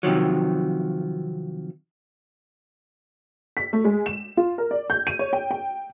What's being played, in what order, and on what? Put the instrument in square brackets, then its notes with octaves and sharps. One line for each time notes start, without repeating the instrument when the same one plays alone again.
[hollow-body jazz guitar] C3 D#3 F3 F#3
[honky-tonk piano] B6
A3
G#3
E7
F4
A#4
D5
G6
D#7
C#5
G5
G5